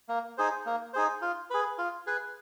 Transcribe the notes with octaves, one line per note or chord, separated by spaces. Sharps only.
A#3
D#4 G#4 C5
A#3
D#4 G#4 C5
F4
G#4 B4
F4
G#4 B4